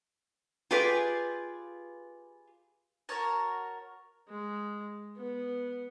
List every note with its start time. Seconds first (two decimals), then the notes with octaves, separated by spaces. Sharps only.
0.71 F4 G4 G#4 B4 D5
3.09 F#4 A#4 C#5 A5
4.29 G#3
5.17 B3